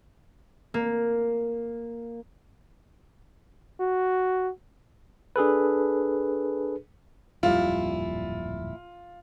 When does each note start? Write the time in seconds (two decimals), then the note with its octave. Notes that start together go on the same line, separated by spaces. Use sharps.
0.74 A#3
3.80 F#4
5.36 D4 G#4 A4 B4
7.43 D1 F2 A#2 G3 E4 F4